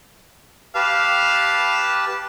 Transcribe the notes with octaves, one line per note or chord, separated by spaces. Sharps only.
G4 B4 F5 A5